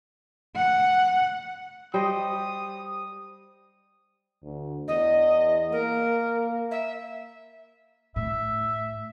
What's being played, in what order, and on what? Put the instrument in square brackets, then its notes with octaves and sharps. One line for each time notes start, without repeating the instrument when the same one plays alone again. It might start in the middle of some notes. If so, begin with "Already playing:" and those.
[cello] F#5
[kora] G3 C5 D#5 [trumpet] D#6
[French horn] D2
[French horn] E2 [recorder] D#5
[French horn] A#3 [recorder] A#4
[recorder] E5
[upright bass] A2 [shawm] E5